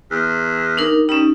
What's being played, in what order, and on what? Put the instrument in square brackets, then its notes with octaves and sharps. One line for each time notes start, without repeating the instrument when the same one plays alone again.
[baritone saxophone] E2
[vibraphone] D4 D#4 A#4
[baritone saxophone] G3 [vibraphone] C#4 D#4